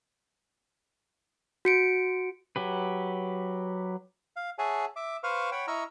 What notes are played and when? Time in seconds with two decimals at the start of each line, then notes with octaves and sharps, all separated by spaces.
1.65 F#4 C#7 D7
2.56 F#3 G4 B4
4.36 F5
4.59 G#4 C#5 E5 F#5 G#5 A5
4.96 E5 D6
5.23 B4 C5 F5 C#6 F6
5.52 C#5 F#5 G5 B5
5.68 E4 D#5 A#5 C#6 E6 F6